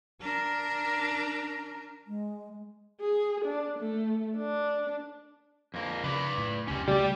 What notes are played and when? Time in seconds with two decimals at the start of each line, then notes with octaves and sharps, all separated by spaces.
0.21 D4 A#4
2.07 G#3
3.00 G#4
3.44 D4
3.79 A3
4.37 D4
5.74 F2 A#3
6.04 C#3 B4 D5
6.38 A2
6.67 F1 C#2 C3 C#4 G4
6.88 C#3 G3 A3 G4 D5